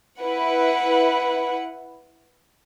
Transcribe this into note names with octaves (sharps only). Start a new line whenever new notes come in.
E4 B4 F#5